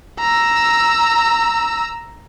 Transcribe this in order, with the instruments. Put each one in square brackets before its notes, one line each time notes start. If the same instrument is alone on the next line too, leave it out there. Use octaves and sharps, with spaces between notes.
[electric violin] A#5 E6